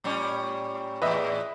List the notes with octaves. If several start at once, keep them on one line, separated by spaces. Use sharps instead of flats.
A2 G3 C#4
E2 A2 B4 D#5 E5